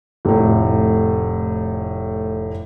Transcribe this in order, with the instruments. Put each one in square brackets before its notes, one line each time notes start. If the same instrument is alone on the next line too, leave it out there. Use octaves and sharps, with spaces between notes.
[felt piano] F1 A2